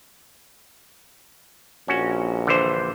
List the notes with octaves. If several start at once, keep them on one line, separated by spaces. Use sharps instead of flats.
A#1 C#4 F#4
D3 E3 C5